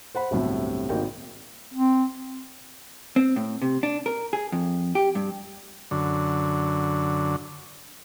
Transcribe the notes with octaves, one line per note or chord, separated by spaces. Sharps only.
C5 F#5 B5
G1 C2 A2 C3 F#3
G#1 A#3 D#4 G5
C4
C4
A2
C3
D4
A#4
G#4
F2
G4
G2
F#2 D3